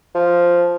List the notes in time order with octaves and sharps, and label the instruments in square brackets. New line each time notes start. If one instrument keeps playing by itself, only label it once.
[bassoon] F3